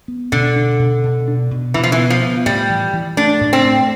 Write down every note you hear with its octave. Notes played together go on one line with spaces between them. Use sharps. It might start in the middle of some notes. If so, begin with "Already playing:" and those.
B3
B2 D3
D4
B2
B2
D4
B2
B2 E3
F3
E3
B3
F3
B3
A2 G3
E3
E3
A3 D4
A2
C4
A3